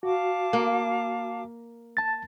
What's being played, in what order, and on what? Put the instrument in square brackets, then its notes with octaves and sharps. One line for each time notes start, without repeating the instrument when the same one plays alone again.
[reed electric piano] F#4 [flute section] F5 A5 D6
[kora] A#3
[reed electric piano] A5 A6